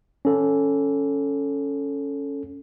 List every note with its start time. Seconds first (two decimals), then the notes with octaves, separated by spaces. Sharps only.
0.25 C#4 A4